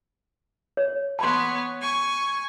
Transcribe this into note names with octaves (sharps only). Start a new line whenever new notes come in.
C#5
B3 C#5 A5 B5 C6
G#5 C#6